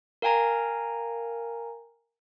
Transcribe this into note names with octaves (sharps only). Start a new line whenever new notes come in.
A#4 F5 G5 G#5 A#5